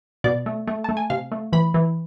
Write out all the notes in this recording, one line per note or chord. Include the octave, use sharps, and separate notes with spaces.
B2 D5
A3
A3
A3 A5
G#5
C3 F5
A3
E3 B5
E3